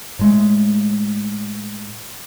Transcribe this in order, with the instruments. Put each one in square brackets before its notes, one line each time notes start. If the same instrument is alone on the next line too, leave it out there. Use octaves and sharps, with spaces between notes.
[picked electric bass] A2 G#3 A3